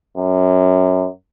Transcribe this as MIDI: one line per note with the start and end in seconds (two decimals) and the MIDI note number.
0.17 1.07 42